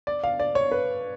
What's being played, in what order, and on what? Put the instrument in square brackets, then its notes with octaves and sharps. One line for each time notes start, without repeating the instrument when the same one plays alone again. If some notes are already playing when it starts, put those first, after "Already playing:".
[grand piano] D5
F5
D5
C#5
B4